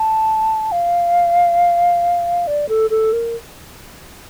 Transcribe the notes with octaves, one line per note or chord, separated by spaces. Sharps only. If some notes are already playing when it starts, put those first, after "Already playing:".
Already playing: A5
F5
D5
A4
A4
A#4